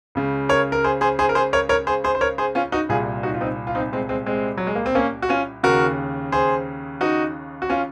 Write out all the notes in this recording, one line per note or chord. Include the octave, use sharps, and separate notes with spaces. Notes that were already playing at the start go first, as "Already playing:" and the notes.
C#2 C#3
A#4 C#5
A#4
G#4 C5
G#4 C5
G#4 C5
A#4
G#4 C5
A#4 C#5
A#4 C#5
G#4 C5
G#4 C5
C5
A#4 C#5
G#4 C5
C#4 F4
D#4 F#4
C2 A#2 F4 G#4
D#4 F#4
F4
C4 D#4
F4
C4 D#4
G#3 C4
G#3 C4
G#3 C4
F#3
G#3
A#3
C4
A#3 C#4
F#4
C#4 F4
D#2 C#3 F#4 A#4
G#4 C5
D#4 F#4
F#4
C#4 F4